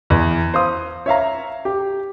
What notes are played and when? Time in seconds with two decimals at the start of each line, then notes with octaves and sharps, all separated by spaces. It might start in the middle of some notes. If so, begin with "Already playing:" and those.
0.10 E2
0.54 C5 F5 D#6
1.06 C#5 E5 F5 A#5
1.65 G4